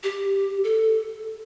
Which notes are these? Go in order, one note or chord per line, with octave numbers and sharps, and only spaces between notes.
G4
A4